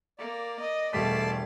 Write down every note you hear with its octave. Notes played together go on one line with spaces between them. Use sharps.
A#3 D5
D#5
E1 G3 A3 D5 A5 C6 B6